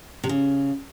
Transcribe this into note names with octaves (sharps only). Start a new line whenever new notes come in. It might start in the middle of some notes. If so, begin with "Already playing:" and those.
C3
C#3